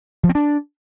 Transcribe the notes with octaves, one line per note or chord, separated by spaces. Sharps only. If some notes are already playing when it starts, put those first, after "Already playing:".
F3
C4
D4